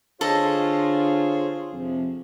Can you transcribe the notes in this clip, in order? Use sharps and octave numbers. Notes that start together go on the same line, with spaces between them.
D3 F4 G#4 A4 C5 C#5 D#5
F2 C3 F3